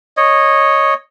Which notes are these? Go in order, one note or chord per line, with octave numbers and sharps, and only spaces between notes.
C#5 D#5